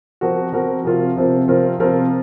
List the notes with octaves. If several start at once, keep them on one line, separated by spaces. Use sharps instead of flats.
F3 C4 F#4 A#4
F3 C4 F#4 A#4
C3 F3 C4 F4 A#4
C3 F3 C4 F4 A#4
C3 F3 C4 F4 A#4
C3 F3 C4 F4 A#4